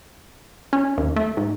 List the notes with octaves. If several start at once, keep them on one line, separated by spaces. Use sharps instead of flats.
C#4
D#2
A3
G#2